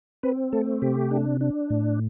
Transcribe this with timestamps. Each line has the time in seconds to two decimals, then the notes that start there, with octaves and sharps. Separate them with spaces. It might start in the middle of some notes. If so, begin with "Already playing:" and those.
0.23 C4 B4
0.53 A3 A4
0.82 C3 G4
1.11 D4
1.41 D4
1.70 A2